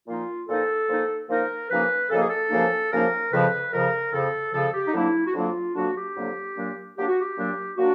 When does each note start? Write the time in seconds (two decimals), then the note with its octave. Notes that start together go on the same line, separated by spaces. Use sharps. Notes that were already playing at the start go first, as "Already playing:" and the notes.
0.07 A#2 F3 A#3 D#4 F4
0.48 A#2 F3 A#3 D#4 A4
0.88 A#2 F3 A#3 D#4
1.28 A#2 F3 A#3 D#4 A#4
1.69 F#2 C#3 F3 A#3 D#4 B4
2.10 F#2 C#3 F3 A#3 D#4 A4
2.19 G#4
2.29 A4
2.50 F#2 C#3 F3 A#3 D#4
2.91 F#2 C#3 F3 A#3 D#4 A#4
3.31 F2 C#3 F3 B4
3.72 F2 C#3 F3 A#4
4.12 F2 C#3 F3 A4
4.53 F2 C#3 F3 A4
4.73 G4
4.85 D#4
4.93 F2 D3 F#3 A#3 D4 E4
5.25 F#4
5.34 F2 D3 F#3 A#3 D4 F4
5.74 F2 D3 F#3 A#3 D4 F#4
5.94 G4
6.15 F2 D3 F#3 A#3 D4
6.56 A#2 F#3 A#3 D4
6.96 A#2 F#3 A#3 D4 G4
7.08 F#4
7.19 G4
7.36 A#2 F#3 A#3 D4
7.77 A#2 F#3 A#3 D4 F#4